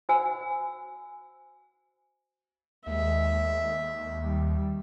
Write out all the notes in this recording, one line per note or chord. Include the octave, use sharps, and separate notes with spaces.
F#4 C5 F#5 G#5 E6
D#2 G#3 E5
G3